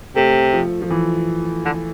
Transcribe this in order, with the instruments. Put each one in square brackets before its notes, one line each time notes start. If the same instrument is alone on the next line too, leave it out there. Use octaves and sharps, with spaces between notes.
[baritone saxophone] C3 [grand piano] A3
[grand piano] F3
F3
E3
[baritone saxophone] D3